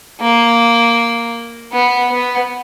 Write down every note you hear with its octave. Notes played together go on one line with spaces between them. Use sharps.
A#3
B3
B3